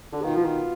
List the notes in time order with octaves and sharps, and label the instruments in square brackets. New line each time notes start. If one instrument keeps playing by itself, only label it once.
[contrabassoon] D3
[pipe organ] B2 B3 F4 [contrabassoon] D#3
[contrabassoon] F3
D#3